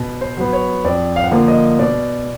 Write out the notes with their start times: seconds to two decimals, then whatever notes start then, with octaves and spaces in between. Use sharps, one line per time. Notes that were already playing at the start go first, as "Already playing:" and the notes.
Already playing: B2
0.21 C5
0.37 F#3 B3
0.53 C#5
0.85 F2 D5
1.16 F5
1.24 F#5
1.31 D3 F3 A#3 F5
1.48 D#5
1.79 B2 D5